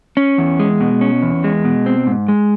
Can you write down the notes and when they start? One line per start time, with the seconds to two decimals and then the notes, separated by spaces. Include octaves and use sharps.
0.17 C#4
0.38 E2
0.60 G#3
0.81 B2
1.01 C#4
1.22 E2
1.44 G#3
1.65 B2
1.86 C4
2.07 G#2
2.28 G#3